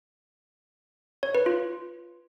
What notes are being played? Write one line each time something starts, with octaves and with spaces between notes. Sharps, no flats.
C#5
B4
F4